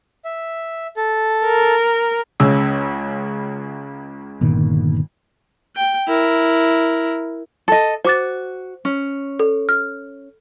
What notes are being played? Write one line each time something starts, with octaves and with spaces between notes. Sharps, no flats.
E5
A4
A#4
C#2 C#3 E6
G1 A#2 D#3
G5
E4 A#4
A4 D#5
F#4 C5 D6 A6
C#4
A4
F6